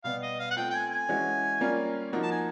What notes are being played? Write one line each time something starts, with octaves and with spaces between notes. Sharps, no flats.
B2 G3 B3 F5
D#5
F5
F#5
A3 C4 F4 A4 G5
G5
G#5
G#5
E3 G#3 C#4 F#4
G3 A#3 C#4 F4
F3 A#3 D#4 F#4
A5
G#5